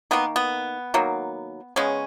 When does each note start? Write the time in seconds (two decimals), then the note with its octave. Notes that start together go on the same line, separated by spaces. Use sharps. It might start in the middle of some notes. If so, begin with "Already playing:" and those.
0.11 D#3 A#3 B3
0.36 B3
0.94 D#3 F#3 A#3
1.76 C#3 G#3 B3 C#4